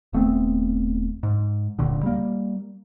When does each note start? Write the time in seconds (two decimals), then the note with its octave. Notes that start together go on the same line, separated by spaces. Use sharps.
0.13 D#1 A3 B3 C4
1.23 G#2
1.79 D1 C#2 A#2 D3
2.03 G3 A#3